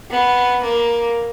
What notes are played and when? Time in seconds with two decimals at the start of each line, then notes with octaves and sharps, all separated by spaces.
0.11 B3
0.63 A#3